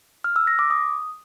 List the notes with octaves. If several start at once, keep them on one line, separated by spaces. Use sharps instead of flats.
F6
E6
A#6
D6
D#6